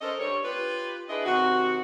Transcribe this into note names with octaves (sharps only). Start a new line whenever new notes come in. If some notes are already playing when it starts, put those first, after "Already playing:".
C#4 A4 A#4 C5 D#5
G2 G3 C#5
F4 G4 B4
D4 E4 G#4 B4 D#5
C3 D#3 F#4